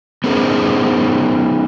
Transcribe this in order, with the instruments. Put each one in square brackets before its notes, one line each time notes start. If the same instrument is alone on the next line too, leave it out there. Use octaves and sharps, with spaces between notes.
[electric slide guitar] B3 C#4 D#4 G#4 A#4 C5